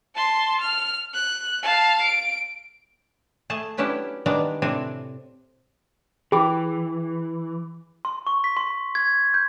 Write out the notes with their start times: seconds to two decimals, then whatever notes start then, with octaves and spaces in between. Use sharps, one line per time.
0.15 A5 C6
0.61 F6
1.14 F#6
1.63 F5 A5
2.02 D7
3.50 A3 G#4 A5
3.77 F#3 B3 C#4 D4 E4 G4
4.26 D#3 G3 G#3 B3 D4 D5
4.62 A2 C3 C4 D4 G#5
6.32 E3 G#4 G5 B5 D6
8.05 C6
8.27 C#6
8.44 B6
8.57 C6
8.95 G#6
9.34 G6